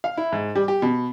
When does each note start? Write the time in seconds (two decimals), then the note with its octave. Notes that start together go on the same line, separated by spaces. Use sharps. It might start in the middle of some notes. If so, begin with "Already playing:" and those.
0.04 F5
0.17 E4
0.32 G#2
0.56 G3
0.68 G4
0.82 B2